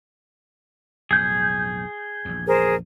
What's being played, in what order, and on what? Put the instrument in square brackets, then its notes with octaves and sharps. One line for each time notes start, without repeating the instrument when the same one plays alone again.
[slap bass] B1 F2 A2 [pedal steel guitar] G#4 G6
[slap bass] A#1 E2
[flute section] G#4 A#4 C5